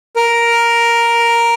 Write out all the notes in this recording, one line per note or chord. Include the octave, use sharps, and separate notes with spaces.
A#4